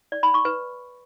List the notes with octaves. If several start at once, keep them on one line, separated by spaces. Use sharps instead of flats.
D5
B5
C#6
B4